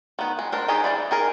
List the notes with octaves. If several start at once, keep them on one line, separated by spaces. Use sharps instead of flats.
D#3 B3
G#3
D4 A#4 C5
D#3 G#3 D#4 G4 G#4
E3 E4 D5 B5
D#4 G#4 A#4